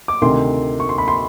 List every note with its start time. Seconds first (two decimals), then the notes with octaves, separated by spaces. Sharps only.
0.08 D6
0.22 D2 C3 D#3 C6
0.80 C#6
0.89 C6
0.98 B5
1.08 C6